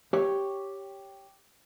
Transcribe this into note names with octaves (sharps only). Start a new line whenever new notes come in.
G4 C#5